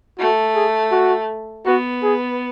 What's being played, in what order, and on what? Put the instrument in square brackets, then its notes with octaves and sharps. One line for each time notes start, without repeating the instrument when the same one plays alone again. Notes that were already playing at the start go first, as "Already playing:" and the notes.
[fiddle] A3 [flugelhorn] F#4
[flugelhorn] G#4
F#4
[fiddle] B3 [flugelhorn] F#4
[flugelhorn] G#4